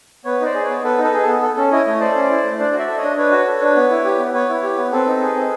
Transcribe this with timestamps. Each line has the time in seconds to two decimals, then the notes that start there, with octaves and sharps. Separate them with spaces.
0.25 B3 B4 C#5
0.41 D#4 C5 D5
0.54 G#4
0.64 B4 C#5
0.70 B3
0.84 B3 A4 B4
0.98 D#4
1.04 A4 B4
1.13 G#4
1.23 B3 A4
1.42 A4
1.56 C#4 A4
1.72 E4 C#5 D#5
1.86 A3 C#5 D#5
2.00 A4 C5 D5
2.15 C#4
2.30 E4
2.44 A3
2.59 D4 C5 D5
2.73 F#4
2.79 D5 E5
2.88 A4
2.98 C#5 D#5
3.03 D4
3.17 D4 B4 C#5
3.31 F#4
3.47 A4
3.61 D4
3.76 B3
3.90 E4
4.04 G4
4.19 B3
4.34 B3 B4 C#5
4.49 E4
4.63 G4
4.78 B3
4.92 C4 A4 B4
5.07 D#4
5.21 G#4
5.36 C4